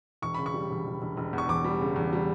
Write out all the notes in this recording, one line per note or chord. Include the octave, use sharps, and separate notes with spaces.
E1 C#6
C#3 B5
C#6
G3
E1
E1
E1
E1
E2 C#6
E1 D6
G3
C#3
E2
G3